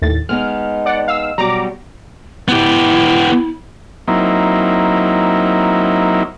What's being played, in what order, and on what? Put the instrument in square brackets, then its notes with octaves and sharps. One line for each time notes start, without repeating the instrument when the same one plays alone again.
[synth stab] D#2 A2 A6
[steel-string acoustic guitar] G#3 B3 D#4 [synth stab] F6
[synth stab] D5 F#5
F5 E6
[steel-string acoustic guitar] B2 F#3 G3 [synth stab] A#5 D6
[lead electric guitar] B3 G4 [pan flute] E4
[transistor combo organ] F#3 A#3 C4 D#4 E4